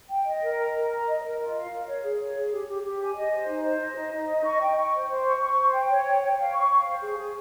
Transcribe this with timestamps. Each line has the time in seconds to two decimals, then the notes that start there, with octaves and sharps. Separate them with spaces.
0.09 G5
0.26 D#5
0.42 A#4
0.58 A#5
0.74 A#4
0.90 A#5
1.06 D#5
1.23 A#4
1.38 F4
1.54 F5
1.71 A#4
1.87 C#5
2.03 G#4
2.19 C#5
2.35 G#4
2.51 G4
2.67 G4
2.83 G4
2.99 G#5
3.15 D#5
3.31 C5
3.47 D#4
3.63 C5
3.80 D#5
3.95 D#4
4.11 D#4
4.28 D#5
4.44 C#6
4.60 G5
4.75 C#6
4.92 C5
5.08 C5
5.24 C#6
5.40 C#6
5.56 C5
5.72 G5
5.88 C#5
6.04 G5
6.21 G5
6.37 F5
6.52 C#6
6.69 F5
6.85 C5
7.01 G#4
7.17 G#4